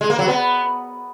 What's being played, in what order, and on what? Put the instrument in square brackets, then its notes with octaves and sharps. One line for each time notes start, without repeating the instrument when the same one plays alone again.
[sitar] G#3
A#3
F#3
B3